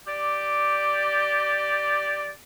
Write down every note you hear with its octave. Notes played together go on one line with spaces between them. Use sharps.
G4 D5